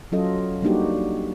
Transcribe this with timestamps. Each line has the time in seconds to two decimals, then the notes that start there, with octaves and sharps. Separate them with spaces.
0.12 F#3 C#4 F4 A4 D#5
0.62 G3 A#3 D4 D#4 F#4 G4